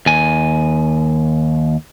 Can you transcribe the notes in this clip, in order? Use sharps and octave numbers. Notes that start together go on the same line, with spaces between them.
D#2 G#5